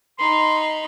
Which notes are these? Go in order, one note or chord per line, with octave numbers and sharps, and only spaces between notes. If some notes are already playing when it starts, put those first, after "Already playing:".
D#4 B5 C6